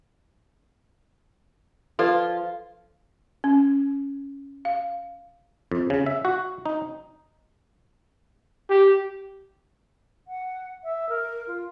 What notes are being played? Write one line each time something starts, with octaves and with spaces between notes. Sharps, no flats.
F3 F4 A4 B4 D5
C#4
F5
F2
C#3
E5
F#4
D#4
G4
F#5
E5
A#4
F4